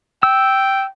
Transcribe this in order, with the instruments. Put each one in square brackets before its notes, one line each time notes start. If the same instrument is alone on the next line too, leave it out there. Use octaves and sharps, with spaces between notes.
[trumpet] G5 [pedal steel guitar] E6